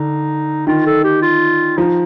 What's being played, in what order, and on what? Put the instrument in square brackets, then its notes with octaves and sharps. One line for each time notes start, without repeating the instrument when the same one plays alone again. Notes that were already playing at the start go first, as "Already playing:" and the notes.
Already playing: [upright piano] D3 [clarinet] D#4
[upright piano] D#3 [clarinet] F4
[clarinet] A4
G4
F4
[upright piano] F3 [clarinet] D#4